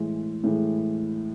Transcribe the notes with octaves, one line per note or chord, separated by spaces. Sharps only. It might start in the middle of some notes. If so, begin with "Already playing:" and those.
Already playing: A2 E3 G#3
A2 E3 G#3